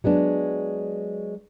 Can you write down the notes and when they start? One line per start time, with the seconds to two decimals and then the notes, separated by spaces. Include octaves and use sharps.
0.04 F#3 G#3 B3 D4